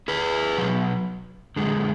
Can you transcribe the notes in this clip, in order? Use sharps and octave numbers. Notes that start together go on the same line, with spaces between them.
G#4 B4
B2 F#3
F#2 D3 G#3